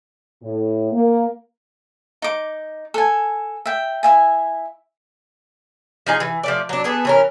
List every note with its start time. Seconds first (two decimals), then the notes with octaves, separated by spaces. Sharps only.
0.42 A2
0.92 A#3
2.22 D#4 D6
2.94 A4 G#5
3.66 E5 G5
4.03 E4 E5 G#5
6.06 F3 D#4 G#4
6.20 E3
6.44 F3 A3 D5
6.69 F#3 D4
6.84 B3 G#4 A4
7.05 E3 C#4 A#4